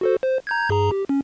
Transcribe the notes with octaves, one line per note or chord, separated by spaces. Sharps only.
F#4 A4 C5
C5
A#5 G6 G#6
G2 G#4 A#5
G4
C#4